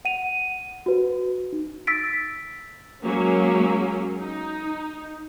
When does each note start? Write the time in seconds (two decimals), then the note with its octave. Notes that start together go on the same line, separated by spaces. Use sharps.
0.05 F#5 D#7 F7
0.86 F#4 B4
1.53 D#4
1.87 E6 A6 B6 D7
3.03 F#3 G#3 A#3 C#4
4.20 D#4